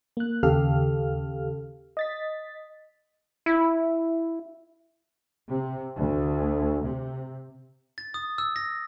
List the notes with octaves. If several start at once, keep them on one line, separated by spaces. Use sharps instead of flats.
A#3 F#6
D#2 C#3 G4 A4 F5 F6
D#5 A6 B6
E4
C3
D2
C3
A6
D#6
E6
A#6